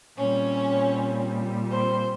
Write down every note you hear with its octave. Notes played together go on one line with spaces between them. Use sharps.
A#2 G3 C4 C#4 C#5
C4 C5